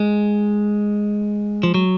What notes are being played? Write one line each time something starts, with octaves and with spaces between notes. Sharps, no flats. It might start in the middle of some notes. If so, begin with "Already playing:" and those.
Already playing: G#3
F3
F#3